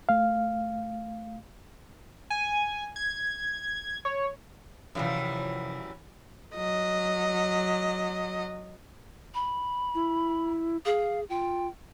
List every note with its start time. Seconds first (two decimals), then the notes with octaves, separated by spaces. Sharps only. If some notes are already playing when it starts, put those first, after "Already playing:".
0.09 A3 F5
2.30 G#5
2.96 G#6
4.05 C#5
4.95 F#2 C3 E3 F3 G3 F5
6.56 F#3 D#5
9.34 B5
9.95 E4
10.85 G#4 F5
11.30 F4 G5